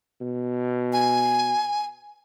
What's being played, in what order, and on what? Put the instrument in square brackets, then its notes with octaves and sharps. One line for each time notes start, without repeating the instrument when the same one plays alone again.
[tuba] B2
[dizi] G#5